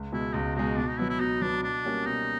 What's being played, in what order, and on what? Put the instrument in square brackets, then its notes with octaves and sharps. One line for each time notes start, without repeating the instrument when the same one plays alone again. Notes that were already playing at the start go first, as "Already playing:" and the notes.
Already playing: [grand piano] C#2
[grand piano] B2 G#3 [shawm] E4
[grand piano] C#2 [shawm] D#4
[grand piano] B2 G#3 [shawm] D#4
[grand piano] B2 [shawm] D4
[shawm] D#4
[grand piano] F#3 B3 [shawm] E4
[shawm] E4
[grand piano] B2 [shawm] D#4
[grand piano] F#3 B3 [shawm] D4
[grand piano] B2 [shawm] D4
[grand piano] G3 A#3 C#4 F#4
[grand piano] B2 [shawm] D#4